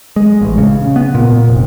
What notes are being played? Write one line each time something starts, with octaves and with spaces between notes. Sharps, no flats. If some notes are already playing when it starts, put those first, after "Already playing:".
G#3
A1
C#3
B3
A#2
F1